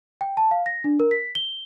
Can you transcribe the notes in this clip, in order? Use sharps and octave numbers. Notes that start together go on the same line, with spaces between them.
G5
A5
F5
A#6
D4
A#4
B6
G7